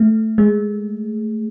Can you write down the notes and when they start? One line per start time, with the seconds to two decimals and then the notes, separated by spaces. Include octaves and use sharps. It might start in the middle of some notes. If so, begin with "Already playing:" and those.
Already playing: A3
0.38 G#3